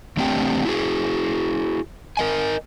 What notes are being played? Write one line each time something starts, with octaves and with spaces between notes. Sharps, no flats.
E2 A3 C4 D4 G4 G5
E4 F#4 G#4
A#4 D#5 G#5